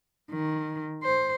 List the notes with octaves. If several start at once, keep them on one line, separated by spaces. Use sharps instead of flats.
D#3
C5